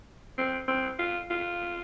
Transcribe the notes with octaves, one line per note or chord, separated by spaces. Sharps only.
C4
C4
F4
F4